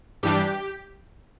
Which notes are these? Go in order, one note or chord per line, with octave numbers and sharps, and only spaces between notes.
G2 E3 G3 D4 G4